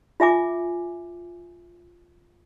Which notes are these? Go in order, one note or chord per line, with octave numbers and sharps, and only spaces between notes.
F4 E5 G#5 D6